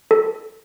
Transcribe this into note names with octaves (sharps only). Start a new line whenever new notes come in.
A4